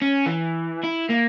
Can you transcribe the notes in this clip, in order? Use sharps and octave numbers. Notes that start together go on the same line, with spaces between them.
C#4
E3
E4
A#3